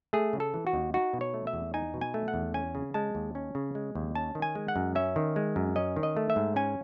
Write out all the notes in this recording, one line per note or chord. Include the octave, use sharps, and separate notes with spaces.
A3 G#4
C#3
A4
E3
F#4
D#2
D#4 F#4
B2
C#5
A3
E5
E2
D#4 G#5
B2
G#5
A3
F#5
E2
C#4 G#5
C#3
G#3 A5
D#2
C#4
C#3
G#3
D#2
C#4 A5
D#3
G#5
G#3
F#5
F#2
C#4 E5
D#3
G#3
F#2
C#4 D#5
D#3
D#5
A3
E5
G#2
C#4 G#5